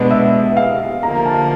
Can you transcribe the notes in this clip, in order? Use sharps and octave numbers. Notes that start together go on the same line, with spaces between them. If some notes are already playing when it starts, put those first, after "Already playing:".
Already playing: B2 G#3 B3 D4 D#5
E5
F5
D3 F3 A#3 A#5
A5